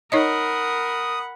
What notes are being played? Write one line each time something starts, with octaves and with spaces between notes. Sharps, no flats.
D#4 A#4 C#5 D#5 F#5 B5 D#6